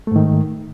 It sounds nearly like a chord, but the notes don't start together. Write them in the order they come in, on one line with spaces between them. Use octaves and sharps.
A3 G#2 D#3